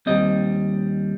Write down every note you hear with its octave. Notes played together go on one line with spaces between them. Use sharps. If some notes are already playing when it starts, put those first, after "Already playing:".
D#2 D#3 G3 C4 D#5